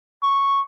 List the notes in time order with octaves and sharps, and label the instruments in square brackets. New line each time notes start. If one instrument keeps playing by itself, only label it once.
[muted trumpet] C#6